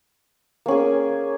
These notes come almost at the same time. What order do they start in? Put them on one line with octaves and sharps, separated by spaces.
A#3 C#4 G#4